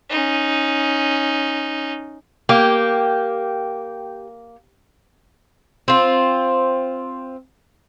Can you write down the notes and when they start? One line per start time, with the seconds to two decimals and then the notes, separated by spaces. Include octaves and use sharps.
0.10 C#4 D#4
2.49 A#3 G4
5.88 C4 F4